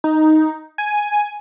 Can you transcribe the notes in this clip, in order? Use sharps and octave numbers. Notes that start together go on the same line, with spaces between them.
D#4
G#5